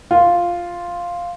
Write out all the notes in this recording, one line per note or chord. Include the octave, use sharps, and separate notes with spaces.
F4